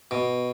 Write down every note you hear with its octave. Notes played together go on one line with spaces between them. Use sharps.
B2